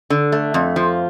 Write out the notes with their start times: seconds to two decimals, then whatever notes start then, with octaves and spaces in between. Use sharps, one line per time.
0.10 D3
0.32 A3
0.54 F2
0.76 F3